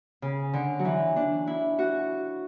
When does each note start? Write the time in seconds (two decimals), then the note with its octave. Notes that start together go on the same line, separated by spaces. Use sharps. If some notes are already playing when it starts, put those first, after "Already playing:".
0.22 C#3
0.54 D3
0.79 F#3
0.85 E3
1.16 D4
1.47 E4
1.79 F#4